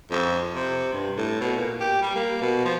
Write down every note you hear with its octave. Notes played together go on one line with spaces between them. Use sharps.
F2
C3
G2
A2
B2
A#2
G4
G3
A#3
B2
F3